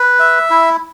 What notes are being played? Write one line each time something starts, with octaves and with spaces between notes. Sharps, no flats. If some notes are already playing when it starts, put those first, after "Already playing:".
Already playing: B4
E5
E4